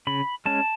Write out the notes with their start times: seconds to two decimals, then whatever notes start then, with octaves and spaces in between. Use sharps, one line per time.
0.07 C#3 B5
0.46 G#3 C#4 A5